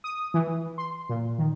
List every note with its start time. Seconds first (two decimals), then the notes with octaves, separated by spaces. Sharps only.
0.04 D#6
0.34 E3
0.78 C6
1.09 A#2
1.38 D#3